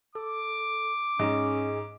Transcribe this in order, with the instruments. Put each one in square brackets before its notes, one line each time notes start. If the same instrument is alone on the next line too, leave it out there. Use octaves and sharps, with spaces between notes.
[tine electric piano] A4 [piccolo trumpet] D6
[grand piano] G#2 [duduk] C#4 [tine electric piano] G#4 D#5